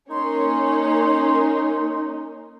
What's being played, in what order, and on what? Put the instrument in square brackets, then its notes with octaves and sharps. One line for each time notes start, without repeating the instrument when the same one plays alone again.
[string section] A#3 C#4 [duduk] D#4 [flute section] C6